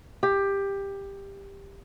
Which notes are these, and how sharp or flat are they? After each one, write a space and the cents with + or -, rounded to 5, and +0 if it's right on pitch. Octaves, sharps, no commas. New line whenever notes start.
G4 +15